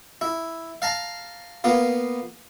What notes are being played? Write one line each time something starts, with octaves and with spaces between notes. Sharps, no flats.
E4
F5 A5 A#5
A#3 B3 F4